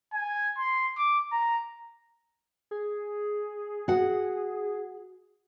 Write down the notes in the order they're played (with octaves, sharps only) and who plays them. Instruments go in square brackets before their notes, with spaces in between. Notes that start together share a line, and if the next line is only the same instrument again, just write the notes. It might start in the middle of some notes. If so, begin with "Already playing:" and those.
[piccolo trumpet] G#5
C6
D6
A#5
[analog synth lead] G#4
[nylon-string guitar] F#4 F#5